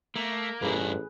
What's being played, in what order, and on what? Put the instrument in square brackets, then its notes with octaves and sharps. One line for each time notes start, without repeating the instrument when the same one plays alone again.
[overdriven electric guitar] A3 [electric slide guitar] A#3
[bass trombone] A1 [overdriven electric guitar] G2 A3 [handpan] G#4 B4